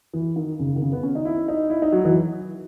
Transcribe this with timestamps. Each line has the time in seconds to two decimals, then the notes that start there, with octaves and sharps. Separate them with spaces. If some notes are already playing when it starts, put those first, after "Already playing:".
0.13 E3
0.36 D#3
0.59 C#3
0.76 D#3
0.82 C#3
0.93 B3
1.03 C#4
1.15 D#4
1.25 E4
1.48 D#4
1.70 E4
1.82 D#4
1.92 F#3
2.05 E3